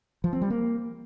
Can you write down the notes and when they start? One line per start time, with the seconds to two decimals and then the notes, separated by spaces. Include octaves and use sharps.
0.24 F3
0.33 C4
0.42 G3
0.50 A#3